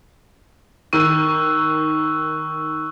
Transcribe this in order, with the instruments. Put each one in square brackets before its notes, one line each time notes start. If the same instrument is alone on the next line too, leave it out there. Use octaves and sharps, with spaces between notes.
[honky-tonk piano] D#3 D#7 [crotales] C#6 E6 F#6
[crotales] C#6